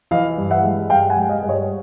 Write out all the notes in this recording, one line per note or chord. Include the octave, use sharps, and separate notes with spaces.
E3 D#5 F5
G2
E5 F#5
G#3
G2 F5 G5
F#5 G#5
G#3
D#5 F5
G2
C#5 D#5